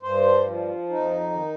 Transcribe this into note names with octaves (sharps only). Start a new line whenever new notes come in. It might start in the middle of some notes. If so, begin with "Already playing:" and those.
G2 C5
F3
F2 D#4
D#3